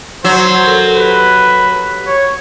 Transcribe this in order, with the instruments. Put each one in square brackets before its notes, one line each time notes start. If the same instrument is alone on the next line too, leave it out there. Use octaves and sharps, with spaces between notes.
[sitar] F#3 [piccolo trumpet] C5
[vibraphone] A4 A#4
[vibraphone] G4 [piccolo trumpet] B4
[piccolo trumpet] C#5